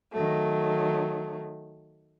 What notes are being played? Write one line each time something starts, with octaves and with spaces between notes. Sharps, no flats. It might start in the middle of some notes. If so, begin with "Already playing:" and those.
D#3 F#3 A3